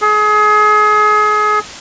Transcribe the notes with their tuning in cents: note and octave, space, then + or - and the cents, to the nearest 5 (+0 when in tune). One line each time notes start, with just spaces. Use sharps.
G#4 +30